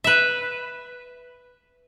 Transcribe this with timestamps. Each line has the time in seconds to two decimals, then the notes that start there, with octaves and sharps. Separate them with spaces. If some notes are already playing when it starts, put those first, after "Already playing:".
0.04 B4 E5